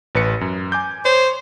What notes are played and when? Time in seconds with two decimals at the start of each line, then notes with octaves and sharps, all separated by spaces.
0.15 A1 B4 C#7
0.41 F#2
0.72 G#5 D6 G6
1.05 C5 C#5